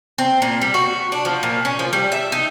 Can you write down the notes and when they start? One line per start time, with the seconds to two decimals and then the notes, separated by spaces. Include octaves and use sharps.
0.18 C4
0.42 A#2
0.62 G3
0.74 F#4
1.12 D4
1.25 F3
1.43 A#2
1.65 C#4
1.79 F3
1.93 G3
2.12 E5
2.32 D#4